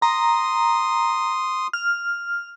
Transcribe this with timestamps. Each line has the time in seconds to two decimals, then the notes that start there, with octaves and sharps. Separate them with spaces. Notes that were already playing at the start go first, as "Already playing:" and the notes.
0.02 A#5 C6 D#6
1.73 F6